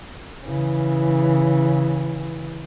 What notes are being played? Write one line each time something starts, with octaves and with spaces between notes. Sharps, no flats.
C#3 E3